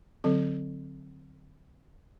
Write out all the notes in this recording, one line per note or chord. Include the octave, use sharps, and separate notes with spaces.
D3 F#3 C4 A4